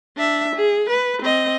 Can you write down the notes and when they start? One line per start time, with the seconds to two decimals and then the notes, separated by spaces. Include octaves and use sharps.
0.16 D4 E5
0.56 G#4
0.90 B4
1.22 C4 D#5